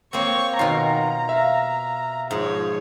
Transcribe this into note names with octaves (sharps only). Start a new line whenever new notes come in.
A#3 C4 C#5 C#6
B2 D#3 F4 A#5 C7
E5 F5
G#2 F3 C#5